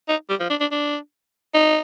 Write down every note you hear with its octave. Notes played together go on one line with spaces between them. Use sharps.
D#4
G3
F3
D4
D4
D4
D#4